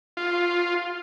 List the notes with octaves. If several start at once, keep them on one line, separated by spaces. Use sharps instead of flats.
F4